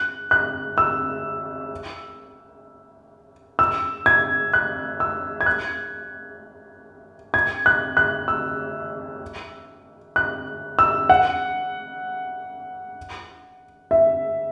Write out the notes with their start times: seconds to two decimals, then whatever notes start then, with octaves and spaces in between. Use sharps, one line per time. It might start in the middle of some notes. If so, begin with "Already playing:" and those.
Already playing: F#6
0.31 F#6
0.78 E6
3.59 E6
4.06 G#6
4.54 F#6
5.00 E6
5.41 G#6
5.46 F#6
7.34 G#6
7.66 F#6
7.97 F#6
8.28 E6
10.16 F#6
10.79 E6
11.09 F#5
13.91 E5